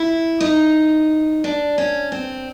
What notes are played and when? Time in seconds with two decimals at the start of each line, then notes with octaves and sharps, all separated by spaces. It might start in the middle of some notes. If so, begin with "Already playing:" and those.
Already playing: E4
0.41 D#4
1.44 D4
1.78 C#4
2.12 C4